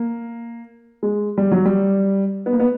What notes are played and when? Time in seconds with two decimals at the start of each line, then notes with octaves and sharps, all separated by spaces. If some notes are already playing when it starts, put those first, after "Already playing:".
Already playing: A#3
1.03 G#3
1.38 G3
1.52 F#3
1.65 G3
2.46 B3
2.53 A#3
2.60 B3